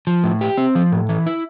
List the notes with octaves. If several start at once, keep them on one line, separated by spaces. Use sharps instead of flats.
F3
A2
G4
C4
F3
A2
E3
E4